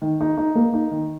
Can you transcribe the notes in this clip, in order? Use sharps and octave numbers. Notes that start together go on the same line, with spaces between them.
D#3
D#4
D#4
A#3
D#4
D#3